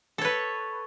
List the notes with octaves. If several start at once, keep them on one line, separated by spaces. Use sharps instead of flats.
A4 B4 C#5